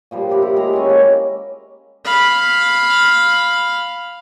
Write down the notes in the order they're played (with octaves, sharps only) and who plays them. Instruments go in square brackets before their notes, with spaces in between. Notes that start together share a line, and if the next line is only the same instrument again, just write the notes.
[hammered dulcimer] A#2 F3 G3
E4 G4 A#4 F#5
E4
G#3 E4 A#5
C#4 G#5
A#3
[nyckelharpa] F5 B5